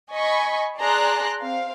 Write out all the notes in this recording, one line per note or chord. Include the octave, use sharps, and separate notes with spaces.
D#5 G#5 B5 C#6
G#4 D5 A5 A#5 C6 F#6
C4 F5